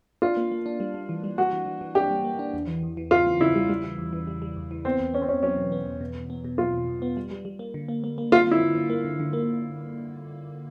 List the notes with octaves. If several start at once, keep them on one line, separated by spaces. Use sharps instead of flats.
D4 F4
A#3
A#3
D4
G3
G3
E3
G3
G3 F#4
E3
E3
E3
D4 G4
G3
A#3
D4
E2
E3
E2
E3
C#3 F4
E3
C#3 E4
G3
G3
E3
E2
E3
G3
G3
E2
E3
B3 C4
E2
B3 C#4
C4
E2 C#4
F#3 C#4
B2
B3
E2
B2
E2
B3
B2
F#3 F4
E2
E2
B3
G3
G3
G3
A#3
D3
A#3
A#3
A#3
D3 F4
D3 E4
D3
D3
A#3
D3
D3
A#3